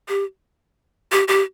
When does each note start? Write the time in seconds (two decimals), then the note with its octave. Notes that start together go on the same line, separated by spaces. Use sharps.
0.08 G4
1.12 G4
1.28 G4